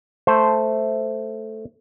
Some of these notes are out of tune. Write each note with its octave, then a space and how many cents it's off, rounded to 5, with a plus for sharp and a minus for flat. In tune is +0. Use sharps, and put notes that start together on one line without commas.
A3 +0 C5 +0